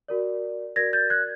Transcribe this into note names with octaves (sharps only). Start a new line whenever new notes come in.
F#4 A#4 D5
F#4 A#4 D5 G#6 A#6
G6 A6
F#6 G#6